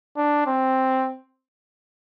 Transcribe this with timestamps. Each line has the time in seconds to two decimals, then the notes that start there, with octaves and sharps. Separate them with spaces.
0.17 D4
0.47 C4